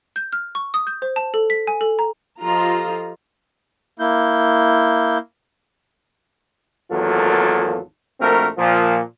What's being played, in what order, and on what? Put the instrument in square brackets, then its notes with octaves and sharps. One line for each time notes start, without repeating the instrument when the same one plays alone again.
[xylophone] G6
F6
C#6
D#6
G6
C5
A5
A4
B6
G#5
A4
A#5
[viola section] F3 F4 G4 A4 D#5 A#5
[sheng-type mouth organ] A#3 E4 G6
[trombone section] G#1 E2 F#3 A#3 F4 A4
A#1 A3 C4 F#4 A#4
A#2 F3